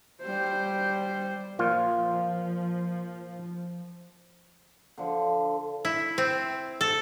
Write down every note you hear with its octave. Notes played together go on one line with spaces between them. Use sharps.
G3 C5
A#2 F3 F4
D3 F3
E4
C4
A4